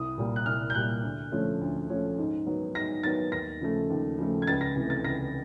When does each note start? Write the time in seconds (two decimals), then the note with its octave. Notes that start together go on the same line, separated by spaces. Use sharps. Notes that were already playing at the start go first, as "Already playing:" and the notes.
Already playing: C2 D#6
0.18 A#2 G3 A#3
0.36 F#6
0.46 C2 F6
0.70 G6
0.75 A#2 G3 A#3 F#6
1.04 D2
1.32 D3 F3 A3 C#4
1.61 D2
1.89 D3 F3 A3 C#4
2.18 G#2
2.46 D#3 F#3 B3
2.75 G#2 A#6
3.03 D#3 F#3 B3 A6
3.32 D#2 A#6
3.61 C#3 F3 A3
3.90 D#2
4.18 C#3 F3 A3
4.42 G#6
4.47 C#2 A6
4.61 A#6
4.76 C3 E3 A3
4.90 A6
5.04 C#2 A#6